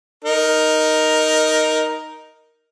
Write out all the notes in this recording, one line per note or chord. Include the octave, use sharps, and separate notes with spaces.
D#4 A#4